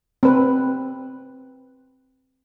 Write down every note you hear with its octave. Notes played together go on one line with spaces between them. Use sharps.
C4 B4